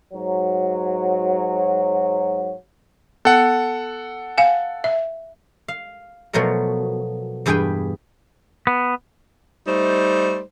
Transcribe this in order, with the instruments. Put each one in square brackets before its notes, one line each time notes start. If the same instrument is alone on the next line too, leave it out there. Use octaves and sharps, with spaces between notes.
[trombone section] G#2 F#3
[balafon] B3 [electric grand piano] A4 F#5
[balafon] F5 G#5
E5
[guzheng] F5
B2 F3 F#3 A3 A#4
E2 G2 G#4 B4 G5 G#5
[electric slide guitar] B3
[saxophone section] G3 A3 D#4 C5